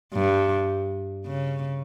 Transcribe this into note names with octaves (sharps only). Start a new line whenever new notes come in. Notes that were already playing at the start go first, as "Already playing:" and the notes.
G2
C#3